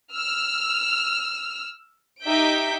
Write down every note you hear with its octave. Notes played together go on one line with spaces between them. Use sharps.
E6 F6
D#4 G4 E5 G6 B6 D7